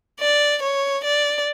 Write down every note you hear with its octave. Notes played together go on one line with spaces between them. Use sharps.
D5
C#5
D5